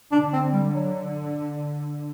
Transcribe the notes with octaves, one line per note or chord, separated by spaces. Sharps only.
D3 D4
C4
G3
F#3